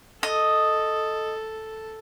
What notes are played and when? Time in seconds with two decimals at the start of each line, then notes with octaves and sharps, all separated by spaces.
0.23 A4 D#5